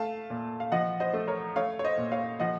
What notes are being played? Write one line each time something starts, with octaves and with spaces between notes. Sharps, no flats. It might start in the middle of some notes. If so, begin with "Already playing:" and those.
Already playing: A3 F5 A5
A#2
F5
F3 D#5 F#5
C5 D#5
A3
A#4 C#5
A3 C#5 F5
C#5
C5 D#5
A#2
C#5 F5
F3 D#5 F#5